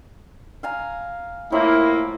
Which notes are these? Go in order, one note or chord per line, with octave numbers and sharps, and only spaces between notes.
F5 G#5 A#5
A2 F3 A#3 E4 D5